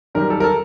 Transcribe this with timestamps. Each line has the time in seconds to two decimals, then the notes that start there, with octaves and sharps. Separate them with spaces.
0.15 F#2 D#3 G3 A#4
0.30 A4
0.40 A#4
0.44 A4